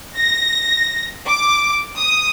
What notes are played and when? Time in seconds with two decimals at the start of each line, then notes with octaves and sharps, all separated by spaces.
0.17 A#6
1.27 D6
1.97 D#6